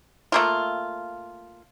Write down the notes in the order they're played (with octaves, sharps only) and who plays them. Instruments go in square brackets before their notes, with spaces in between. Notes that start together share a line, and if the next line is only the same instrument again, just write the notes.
[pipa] A3 A#3 F4